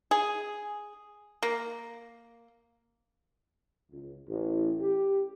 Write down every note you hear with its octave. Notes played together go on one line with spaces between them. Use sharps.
G#4
A#3
C#2
A1
G4